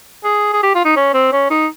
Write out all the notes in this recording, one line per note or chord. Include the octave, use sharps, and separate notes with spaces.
G#4
G#4
G4
F4
D#4
C#4
C4
C#4
D#4